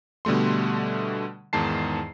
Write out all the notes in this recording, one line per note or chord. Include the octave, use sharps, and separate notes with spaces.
B2 D3 G3 A3 C6
E2 G#2 D#3 A5 C7